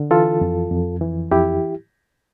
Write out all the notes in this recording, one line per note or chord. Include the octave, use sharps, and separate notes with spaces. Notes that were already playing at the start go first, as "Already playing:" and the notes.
Already playing: D3
E3 F4 A4
F2
F2
E3
F2 E4 G4